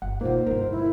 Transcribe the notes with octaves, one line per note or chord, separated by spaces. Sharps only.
G1 F#5
B2 D3 A#3 D#4 F4 C5
D2 G2 D#4 A#4
E4